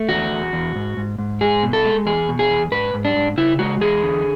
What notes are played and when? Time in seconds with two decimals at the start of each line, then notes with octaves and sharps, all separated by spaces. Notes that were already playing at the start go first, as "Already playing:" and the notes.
Already playing: A3
0.09 E2 F#4
0.31 E2
0.53 E2
0.75 G#2
0.97 G#2
1.18 G#2
1.41 G#3 G#4
1.63 B2
1.73 A4
1.85 G#3
2.06 E2 G#4
2.28 B2
2.39 G#4
2.50 E2
2.71 G#2 B4
2.94 G#2
3.05 D4
3.16 G#2
3.37 C#3 E4
3.59 G#3 F#4
3.81 E2 G#4
4.03 D3